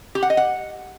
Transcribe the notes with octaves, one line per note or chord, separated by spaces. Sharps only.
G4
F#5
D#5
F#5